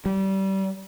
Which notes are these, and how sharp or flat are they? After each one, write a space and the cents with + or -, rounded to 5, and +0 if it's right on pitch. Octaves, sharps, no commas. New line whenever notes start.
G3 -25